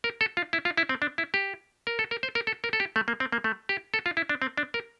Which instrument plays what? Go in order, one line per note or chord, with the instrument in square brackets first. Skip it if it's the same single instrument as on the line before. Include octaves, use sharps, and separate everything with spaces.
[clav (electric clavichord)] A#4
A4
F4
E4
F4
E4
C4
D4
E4
G4
A#4
A4
A#4
C5
A#4
A4
A#4
A4
G4
A3
A#3
C4
A#3
A3
G4
A4
F4
E4
D4
C4
D4
A#4